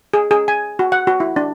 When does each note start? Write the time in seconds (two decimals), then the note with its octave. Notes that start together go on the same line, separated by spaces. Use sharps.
0.14 G#4
0.31 G#4
0.48 G#5
0.79 F#4
0.92 F#5
1.07 F#4
1.20 E4
1.36 D4